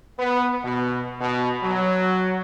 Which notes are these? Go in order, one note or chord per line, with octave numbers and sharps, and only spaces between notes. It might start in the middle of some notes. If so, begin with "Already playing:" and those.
B3
B2
B2
F#3